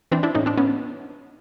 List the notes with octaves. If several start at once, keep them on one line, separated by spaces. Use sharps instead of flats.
E3 C4 D4
D4 E4
A2 C#4 D#4
C4 D4
B3 C#4